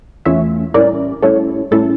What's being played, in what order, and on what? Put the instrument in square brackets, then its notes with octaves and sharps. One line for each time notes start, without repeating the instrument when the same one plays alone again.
[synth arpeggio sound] E2 E3 A3 C#4 F4 C#5 E5
A2 G3 C#4 E4 A#4 D5
A2 G3 C#4 E4 A4 C#5
A2 G3 C#4 E4 A4